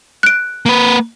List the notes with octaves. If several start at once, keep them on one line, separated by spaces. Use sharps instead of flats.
F#6 D7
A#3 B4